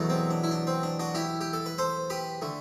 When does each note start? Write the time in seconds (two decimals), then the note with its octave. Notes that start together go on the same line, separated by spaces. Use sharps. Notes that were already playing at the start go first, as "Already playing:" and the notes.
Already playing: E2 B2 F#3 A3
0.10 C4
0.31 D4
0.44 E4
0.51 D4
0.67 C4
0.83 D4
0.99 D4 F#4
1.15 E4 G4
1.41 G4
1.53 A4
1.66 B4
1.78 A4 C5
2.10 G4 B4
2.42 D3 A3